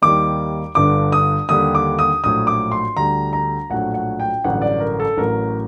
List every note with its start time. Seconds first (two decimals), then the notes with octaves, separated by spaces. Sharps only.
0.02 D#2 D#3 G3 D6
0.75 G1 G2 D3 D6
1.12 D#6
1.49 D#2 D3 G3 D#6
1.75 D6
1.99 D#6
2.23 A#1 A2 F#3 D#6
2.47 D6
2.72 C6
2.96 D2 D3 G3 A#5
3.33 A#5
3.70 A#1 A2 F#3 F#5
3.94 F#5
4.20 G5
4.44 A1 G2 D3 F#3 F#5
4.62 D5
4.80 A#4
5.00 A4
5.17 A1 A2 F#3 A#4